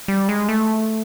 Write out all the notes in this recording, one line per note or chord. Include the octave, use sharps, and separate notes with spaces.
G3
G#3
A3